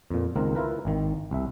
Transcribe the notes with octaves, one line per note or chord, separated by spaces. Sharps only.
F2 A#2
C#2 D#3 A#3 C4 A#4
E4 F4 A#4 B4
G#1 D#3
C2 E5